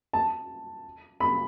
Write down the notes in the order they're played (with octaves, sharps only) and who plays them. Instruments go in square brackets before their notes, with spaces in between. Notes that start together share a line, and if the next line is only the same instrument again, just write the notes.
[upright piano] A5
B5